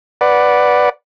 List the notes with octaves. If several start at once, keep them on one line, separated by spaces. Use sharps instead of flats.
B4 D5 F#5